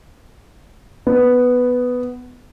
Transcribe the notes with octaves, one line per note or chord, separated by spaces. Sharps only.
B3